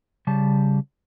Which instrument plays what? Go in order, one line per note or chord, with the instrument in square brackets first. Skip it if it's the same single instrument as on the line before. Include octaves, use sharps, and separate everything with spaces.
[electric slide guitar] C#3 G3 A5